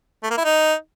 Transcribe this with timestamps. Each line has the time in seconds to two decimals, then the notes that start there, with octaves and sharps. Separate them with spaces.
0.23 A3
0.30 A#3
0.37 E4
0.44 D#4